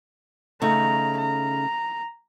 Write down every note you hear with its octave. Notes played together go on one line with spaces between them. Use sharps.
C#3 A3 D#4 A#5
A#5